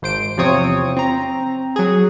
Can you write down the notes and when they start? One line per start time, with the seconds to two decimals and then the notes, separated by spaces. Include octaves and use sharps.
0.02 G#1 C5 D7
0.37 E2 C3 F3 C4 C#5 D#6
0.97 C4 A#5
1.76 F#3 G#4